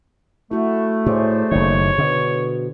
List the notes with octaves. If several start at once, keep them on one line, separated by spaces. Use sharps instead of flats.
A3 E4 F#4
A2 G#4 C5 D5
F#1 D#3 C#5
B2 D3